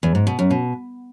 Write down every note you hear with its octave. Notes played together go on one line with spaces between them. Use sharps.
E2
G#2
B2
F#2
B2